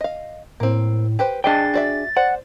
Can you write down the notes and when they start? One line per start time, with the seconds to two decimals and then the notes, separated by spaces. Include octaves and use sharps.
0.01 D#5 F5
0.60 A2 A#3 C4
1.19 G4 B4 C5
1.44 D4 G#4 D5 D#5 G5 A5 A6
1.74 F#4 D5 E5
2.17 C5 D5 F#5